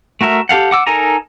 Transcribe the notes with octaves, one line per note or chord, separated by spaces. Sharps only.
A3 F#4 A#4 E5
G4 A4 F5 F#5
F#5 D6 E6
D#4 A4 A#4 G#5 A#5